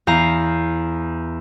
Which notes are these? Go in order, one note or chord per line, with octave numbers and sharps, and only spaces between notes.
E2 F5 A#5